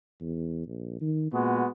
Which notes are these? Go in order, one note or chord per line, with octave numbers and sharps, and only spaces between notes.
E2
A#1
D#3
A#2 G#3 B3 F#4